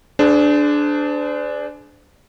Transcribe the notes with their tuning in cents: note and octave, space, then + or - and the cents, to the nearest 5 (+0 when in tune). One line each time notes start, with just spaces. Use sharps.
D4 +0 G#4 +30 C5 -35